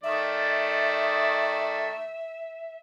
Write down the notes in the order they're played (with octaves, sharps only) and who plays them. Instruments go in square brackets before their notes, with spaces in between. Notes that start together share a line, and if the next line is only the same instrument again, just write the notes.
[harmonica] D#3 A3 D5 [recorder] E5